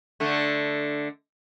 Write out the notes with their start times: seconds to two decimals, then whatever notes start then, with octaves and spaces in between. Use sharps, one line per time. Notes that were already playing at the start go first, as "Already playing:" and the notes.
0.20 D3 A3